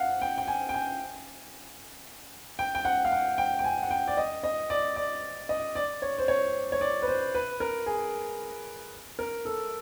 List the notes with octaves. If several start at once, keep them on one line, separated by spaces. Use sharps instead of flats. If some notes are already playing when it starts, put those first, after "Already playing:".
Already playing: F5 F#5
G5
G5
G#5
G5
G#5
G5
G5
F#5
F5
F#5
G5
G5
G#5
F#5
G5
D5
D#5
D#5
D5
D5
D#5
D5
C#5
C5
C#5
C#5
D5
B4
C5
B4
A#4
G#4
A#4
A4